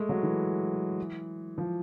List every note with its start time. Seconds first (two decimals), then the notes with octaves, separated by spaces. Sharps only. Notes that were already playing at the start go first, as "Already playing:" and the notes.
Already playing: G#3 A3
0.09 F#3
0.23 E3
1.58 F3